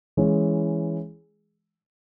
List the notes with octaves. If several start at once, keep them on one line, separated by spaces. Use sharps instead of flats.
E3 G#3 C#4 E4 G#4